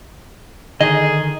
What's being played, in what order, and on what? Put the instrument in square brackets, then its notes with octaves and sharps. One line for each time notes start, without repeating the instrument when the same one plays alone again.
[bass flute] D3 [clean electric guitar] D#3 [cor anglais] G#4 [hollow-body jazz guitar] D#5